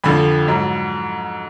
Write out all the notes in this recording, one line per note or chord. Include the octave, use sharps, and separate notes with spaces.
F2 D3 F3 B5
G#2 F#3